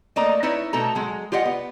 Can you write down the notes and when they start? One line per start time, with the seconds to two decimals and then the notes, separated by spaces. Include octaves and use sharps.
0.16 A3 A#3 D5 D#5 A#5
0.43 D#4 E4 B4 C#5 D5
0.73 B2 A3 A4 A#5
0.95 F#3 G#3
1.32 F4 G4 D5 D#5 F#5 G5
1.45 B3